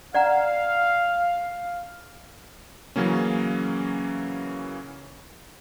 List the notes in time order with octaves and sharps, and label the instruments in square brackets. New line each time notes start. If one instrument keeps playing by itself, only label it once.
[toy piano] D5 F#5 A#5 [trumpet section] F5
[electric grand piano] C#3 E3 F#3 A#3 C#4